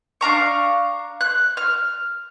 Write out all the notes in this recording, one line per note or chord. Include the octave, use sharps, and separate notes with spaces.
D4 F5 A#5 C#6
F#6
F6